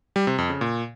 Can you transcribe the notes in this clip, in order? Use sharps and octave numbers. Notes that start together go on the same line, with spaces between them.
G3
C3
F2
C#3
A#2